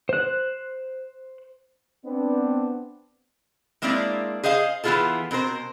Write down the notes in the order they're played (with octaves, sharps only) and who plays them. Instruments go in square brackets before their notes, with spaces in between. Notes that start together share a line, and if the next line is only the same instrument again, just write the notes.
[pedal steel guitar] C5 F#6
[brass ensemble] B3 C4 D4
[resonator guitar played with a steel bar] G#3 A#3 C4 D4 E4 D5
G#4 C5 D#5 F5 G#5
E3 B3 E4 F4 G#4 A4
B2 C4 A#4 C5